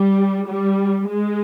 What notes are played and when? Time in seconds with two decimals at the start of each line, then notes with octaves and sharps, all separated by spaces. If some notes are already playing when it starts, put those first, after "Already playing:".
Already playing: G3
0.45 G3
1.07 G#3